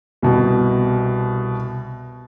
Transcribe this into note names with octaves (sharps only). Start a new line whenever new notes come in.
C2 B2